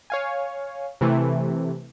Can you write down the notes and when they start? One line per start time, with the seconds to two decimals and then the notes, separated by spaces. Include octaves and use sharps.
0.10 C#5 F5 G#5
1.01 C3 E3 A3